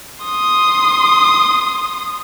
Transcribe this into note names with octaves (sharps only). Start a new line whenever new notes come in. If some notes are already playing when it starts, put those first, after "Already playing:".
C6 D#6